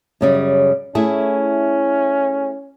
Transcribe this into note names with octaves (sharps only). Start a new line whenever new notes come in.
F#2 C#3 G3
A3 C#4 E4 G#4